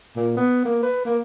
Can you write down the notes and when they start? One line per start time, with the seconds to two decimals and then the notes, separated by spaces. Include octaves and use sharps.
0.16 A#2
0.37 B3
0.65 A#3
0.83 B4
1.05 A#3